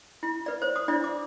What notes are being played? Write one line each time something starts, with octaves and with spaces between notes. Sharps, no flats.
E4
B4 D5
C5 C#5
D#6
D4 E4 D5
D6